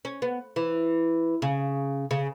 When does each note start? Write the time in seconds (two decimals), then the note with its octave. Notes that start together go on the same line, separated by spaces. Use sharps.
0.05 C#4
0.22 B3
0.56 E3
1.42 C#3
2.11 C#3